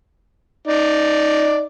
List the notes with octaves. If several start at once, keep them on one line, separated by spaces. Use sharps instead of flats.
D#4 D5